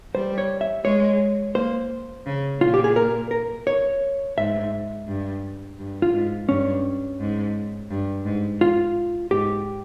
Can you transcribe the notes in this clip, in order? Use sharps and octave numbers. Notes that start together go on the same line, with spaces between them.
G3 C5
C#5
E5
G#3 C#5
A#3 C5
C#3
A#2 F4
G4
G#4
A#4
A#4
C#5
G#2 E5
G2
G2
F4
G#2
G2 C#4
G#2
G2
G#2
F4
G#2 G4